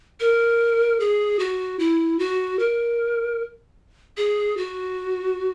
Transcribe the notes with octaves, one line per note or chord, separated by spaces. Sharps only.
A#4
G#4
F#4
E4
F#4
A#4
G#4
F#4